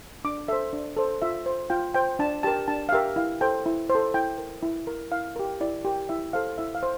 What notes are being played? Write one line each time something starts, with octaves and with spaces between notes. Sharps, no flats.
D4 D6
A4 C5 E5
D4
A4 C5
F4 E5
C5
F4 G5
C5 G5
D4 A5
G4 A#4 A5
D4 A5
F5
G4 A#4 E5
E4 F5
A4 C5 G5
E4
C5
A4
E4 G5
A#4
E4
A#4
E4 F5
G4 A#4
E4 D5
G4 A#4
E4 E5
A4 C5 F5
E4 E5
F5
C5